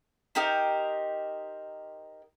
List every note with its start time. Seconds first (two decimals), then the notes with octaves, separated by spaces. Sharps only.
0.35 D#4 G4 A#4 C5